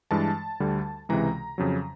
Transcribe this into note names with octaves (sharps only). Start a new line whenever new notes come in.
G2 E3 G#3 A5
D2 D3 G3
C#2 C3 E3 G#3 A#5
F2 C#3 F#3